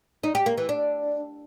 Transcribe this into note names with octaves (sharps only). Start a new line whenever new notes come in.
D#4
G4
A#3
E3
D4